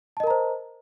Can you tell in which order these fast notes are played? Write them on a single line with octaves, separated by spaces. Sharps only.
A5 D#5 A#4 A#5 C5